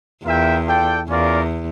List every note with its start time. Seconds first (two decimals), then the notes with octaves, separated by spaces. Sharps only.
0.24 E2 F4 A#4 E5 G5
0.67 F4 A4 D5 G5
1.08 E2 C#4 F4 A#4 D5 F5